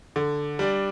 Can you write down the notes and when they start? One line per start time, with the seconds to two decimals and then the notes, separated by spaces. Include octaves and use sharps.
0.16 D3
0.59 G3 D4